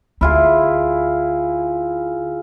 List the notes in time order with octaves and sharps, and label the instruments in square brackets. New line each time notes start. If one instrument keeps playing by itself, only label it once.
[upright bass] D2 [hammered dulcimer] E4 F4 G#4